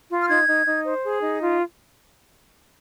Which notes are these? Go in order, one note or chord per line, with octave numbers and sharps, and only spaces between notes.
F4
F6
D#4 G#6
D#4
D#4
C5
G#4
D#4
F4